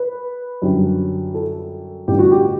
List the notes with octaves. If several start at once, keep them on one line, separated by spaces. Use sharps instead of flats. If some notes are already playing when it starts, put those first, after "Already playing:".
Already playing: B4
F#2 D3 G3
A4
A1 G2 D3 G4
F#4
G4